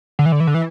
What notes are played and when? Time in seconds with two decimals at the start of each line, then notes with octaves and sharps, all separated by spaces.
0.19 D3
0.26 E3
0.32 D3
0.40 E3
0.47 D3
0.54 E3